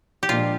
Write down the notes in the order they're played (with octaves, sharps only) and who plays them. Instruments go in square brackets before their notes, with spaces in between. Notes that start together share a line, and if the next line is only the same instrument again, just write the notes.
[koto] G4
[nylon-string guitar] A#2 F3 G#3 D4 [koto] F4